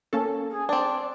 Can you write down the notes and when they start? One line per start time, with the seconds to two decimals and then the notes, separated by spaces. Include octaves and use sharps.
0.13 A#3 C#4 A4
0.50 G#4
0.69 C4 D4 D5